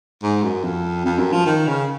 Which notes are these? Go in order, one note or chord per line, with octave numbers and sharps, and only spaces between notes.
G#2
F#2
F2
F2
F#2
F3
D#3
C#3